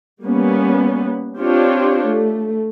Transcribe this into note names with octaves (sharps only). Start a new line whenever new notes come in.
G3 A#3 B3 C#4
C4 D4 F4 G4 C#5
A3